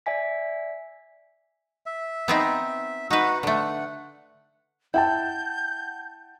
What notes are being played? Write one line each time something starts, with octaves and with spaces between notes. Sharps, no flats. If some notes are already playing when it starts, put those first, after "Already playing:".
D5 E5 G#5 B6
E5
B3 C4 D#4
D#4 F#4 B4 F#5
D3 A3 F#5
E4 F#5 G5 A5 G6